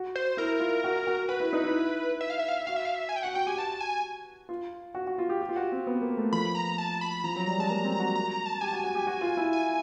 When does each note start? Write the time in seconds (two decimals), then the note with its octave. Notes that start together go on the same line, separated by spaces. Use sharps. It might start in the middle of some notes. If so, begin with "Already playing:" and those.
Already playing: F#4
0.15 C5
0.37 E4 A#4
0.60 F4
0.84 F#4
0.95 F#4
1.07 F#4
1.29 F#4 B4
1.40 E4
1.53 D#4
1.64 E4
2.21 E5
2.30 F5
2.39 E5
2.49 F5
2.58 E5
2.67 F#4 F5
2.76 E5
2.85 F5
2.95 E5
3.09 G#5
3.16 G5
3.23 F#4 F#5
3.34 F#4 G5
3.47 G4 G#5
3.57 F#4 A5
3.81 G#5
4.49 F4
4.95 F#4
5.07 F#4
5.18 F4
5.29 G4
5.41 G4
5.49 F4
5.56 F#4
5.72 C4
5.87 B3
6.01 A#3
6.17 A3
6.32 F3 B5
6.55 A#5
6.78 A5
7.01 B5
7.24 F3 A#5
7.36 F#3
7.46 G3 A#5
7.58 G#3 A5
7.69 A#3 A#5
7.85 C4
7.92 A#5
7.99 F#4
8.15 A#5
8.31 A#5
8.46 A5
8.61 G4 G#5
8.68 A5
8.73 F#4
8.75 G#5
8.84 F#4
8.95 G4
9.07 F#4
9.21 F4
9.37 E4
9.53 G#5